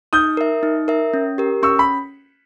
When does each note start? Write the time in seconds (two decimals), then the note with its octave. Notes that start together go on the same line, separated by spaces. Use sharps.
0.13 D#4 D#6 G6
0.37 A#4 E5
0.63 D#4
0.88 A#4 E5
1.13 C#4
1.38 G4 A#4
1.63 C#4 C#6 E6
1.79 B5